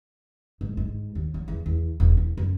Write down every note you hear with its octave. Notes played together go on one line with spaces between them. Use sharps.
G#2
G#2
D#2
F#3
E2
E2
E1
E2
F#2